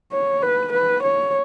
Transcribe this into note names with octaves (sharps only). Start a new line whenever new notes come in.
C#5
B4
B4
C#5